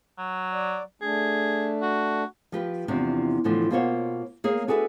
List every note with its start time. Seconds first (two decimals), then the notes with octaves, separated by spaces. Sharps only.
0.18 F#3
0.53 D5
1.02 A3 D4 G#4
1.82 F#4
2.52 F3 G4 B4
2.88 E2 C3 F3 D4
3.44 A2 D3 E3 F3
3.71 B2 A#3 F4 C5 C#5 F#5
4.44 A#3 G#4 C#5
4.67 D4 F#4 G#4 A4 B4 E5